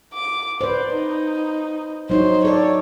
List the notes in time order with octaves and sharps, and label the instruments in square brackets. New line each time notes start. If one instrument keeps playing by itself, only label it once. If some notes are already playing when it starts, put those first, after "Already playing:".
[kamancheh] D6
[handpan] B4 C5 [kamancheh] D5
[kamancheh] D#4
[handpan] F#3 D#4 C#5 [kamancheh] C5
[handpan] A4 D5 [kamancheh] C#5